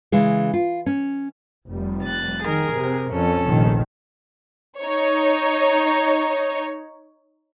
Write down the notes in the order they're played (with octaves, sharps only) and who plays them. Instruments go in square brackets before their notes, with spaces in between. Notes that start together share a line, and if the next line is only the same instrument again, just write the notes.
[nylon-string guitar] C#3 E3 G#3
F4
C#4
[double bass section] F1 G3
[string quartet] F#6 A6
[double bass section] D#3 [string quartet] G#4 A#4
[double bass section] C3
[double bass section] F2 [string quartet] C#4 A4
[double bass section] F1 A#1 D#3
[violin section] D#4 C#5